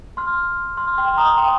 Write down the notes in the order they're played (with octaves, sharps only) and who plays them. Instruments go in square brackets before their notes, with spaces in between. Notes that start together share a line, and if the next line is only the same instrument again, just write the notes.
[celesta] C6 F6
C6 F6
G5 C6
A#5 D#6
G5 C6